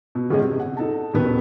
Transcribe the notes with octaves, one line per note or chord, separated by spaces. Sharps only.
B2
G1 G#3 C#4 G#4 D#5
C3
F#5
D#4 A4 A5
D#1 B2 D#3 B3 B4